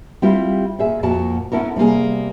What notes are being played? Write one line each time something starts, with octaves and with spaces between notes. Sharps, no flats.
G3 C4 E4 F4 G4
A#2 G#4 E5
F2 A#2 A#3 F#4 A5
B3 C#4 E4 A4 A#4
C3 G3 A#3 G#4